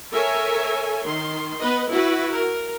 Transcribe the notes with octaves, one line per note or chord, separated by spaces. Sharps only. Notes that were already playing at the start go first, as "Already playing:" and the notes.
A4 A#4 C#5 E5 G#5
D#3 C6
B3 B4 D#5
E4 F#4 B4
A#4